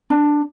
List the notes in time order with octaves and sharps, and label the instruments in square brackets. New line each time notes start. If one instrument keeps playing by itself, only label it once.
[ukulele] D4